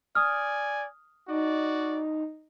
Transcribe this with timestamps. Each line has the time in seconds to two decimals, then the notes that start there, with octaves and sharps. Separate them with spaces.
0.15 D5 G#5 D#6 F6
1.28 D#4 F#4 D5